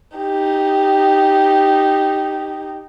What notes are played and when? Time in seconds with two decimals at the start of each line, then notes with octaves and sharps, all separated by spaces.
0.17 D#4 G4